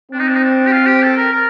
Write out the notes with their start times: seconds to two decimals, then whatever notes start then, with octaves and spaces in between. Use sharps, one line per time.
0.12 C4 D4
0.19 D#4
0.28 D4
0.35 D#4
0.43 D4
0.67 G4
0.72 F4
0.86 G4
1.02 A4
1.17 A#4
1.32 A#4